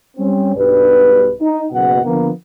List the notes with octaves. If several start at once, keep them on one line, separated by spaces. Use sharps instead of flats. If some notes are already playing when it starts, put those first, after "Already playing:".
G3 C4 C#4
B1 G2 B4
D#4
F#1 B2 F#5
D3 F3 A#3 B3